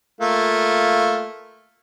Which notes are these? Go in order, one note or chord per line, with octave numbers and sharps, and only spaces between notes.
A3 A#3 F4